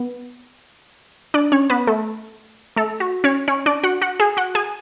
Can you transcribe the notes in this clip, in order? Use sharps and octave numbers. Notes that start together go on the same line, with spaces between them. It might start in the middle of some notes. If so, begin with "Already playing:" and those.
Already playing: B3
D4 D5
C#4 C#5
B3 B4
A3 A4
A3 A4
F#4
C#4 C#5
C#4 C#5
D4 D5
F#4 F#5
F#4 F#5
G#4 G#5
F#4 F#5
G#4 G#5